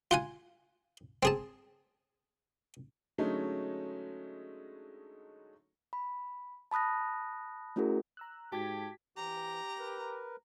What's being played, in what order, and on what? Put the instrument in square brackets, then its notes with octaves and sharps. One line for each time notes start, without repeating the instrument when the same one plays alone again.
[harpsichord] F4 F#5 G#5
C4 G#4 A5
[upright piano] D3 F#3 G#3 A3 C#4 D#4
[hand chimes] B5
A5 B5 D#6 F#6 A#6
A3 C#4 E4 F#4 G#4 A#4
[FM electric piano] A#5 E6 F#6
[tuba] G#2 [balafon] F#4 [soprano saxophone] G4 [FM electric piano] A5 G#6 B6
[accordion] E3 [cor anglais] G4 [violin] A#5
[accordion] A#4 B4